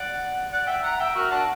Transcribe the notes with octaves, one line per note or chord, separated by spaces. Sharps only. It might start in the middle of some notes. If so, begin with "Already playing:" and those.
Already playing: D5 F#5
D5 F#5
E5 G5
F#5 A#5
E5 G5
F#4 A#4
D4 F#4